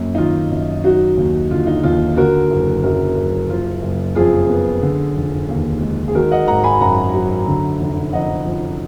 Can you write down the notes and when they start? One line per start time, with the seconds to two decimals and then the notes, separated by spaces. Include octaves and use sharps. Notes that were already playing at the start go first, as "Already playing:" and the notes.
Already playing: F#2 A#3
0.15 D#4
0.18 D#3 F4
0.51 F#2
0.84 F#3 D#4 F#4
1.17 D#2
1.51 D3 F4
1.67 D#4
1.83 D#2 F4
2.16 D3 F#4 A#4
2.50 F#1
2.83 F#2 F#4 A#4
3.17 F#1
3.50 F3 F4
3.82 F#1
4.15 F2 F4 G#4
4.49 B3
4.82 D3
5.16 F1
5.49 D#2
5.81 G#3
6.08 G#4
6.15 D#3 F#4 A#4
6.32 D#5 F#5
6.47 G#1 F#5 A#5
6.64 G#5 B5
6.80 F#2 F#5 A#5
7.14 F#3
7.48 D3
7.80 F1
8.13 F2 D#5 F#5
8.46 F3